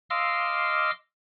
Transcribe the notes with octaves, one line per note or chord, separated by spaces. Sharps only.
D#5 F5 C6 D6 E6 F6